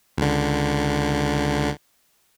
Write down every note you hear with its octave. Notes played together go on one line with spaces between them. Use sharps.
C#2 D3